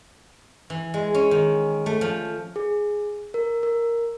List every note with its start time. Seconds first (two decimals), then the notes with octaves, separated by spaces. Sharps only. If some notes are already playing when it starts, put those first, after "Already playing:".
0.70 E3
0.94 G#3
1.14 C#4
1.31 D#3
1.86 A3
2.01 F3
2.56 G#4
3.34 A#4
3.63 A#4